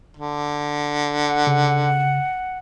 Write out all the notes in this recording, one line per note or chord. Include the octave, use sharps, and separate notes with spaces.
D3
F#5
C#3